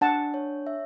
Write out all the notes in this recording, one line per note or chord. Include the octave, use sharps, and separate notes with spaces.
D4 F#5 A5
C#5
E5